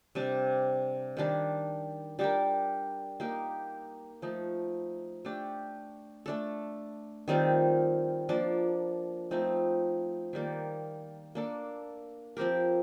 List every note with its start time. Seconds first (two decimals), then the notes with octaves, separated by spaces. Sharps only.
0.15 C3 G3 D4
1.17 D#3 G3 D4
2.19 G3 D4 G4 A#4
3.20 A#3 D#4 G4 A#4
4.22 F3 A3 D#4
5.25 A3 D4 G4
6.26 A3 D4 A4
7.28 D#3 G3 C4 F4
8.29 F3 A#3 D4
9.31 F3 A3 C4 D#4
10.33 D#3 G3 A#3
11.35 A#3 D4 A4
12.37 F3 C4 G4 A#4